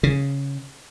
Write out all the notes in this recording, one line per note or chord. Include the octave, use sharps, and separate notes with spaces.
C#3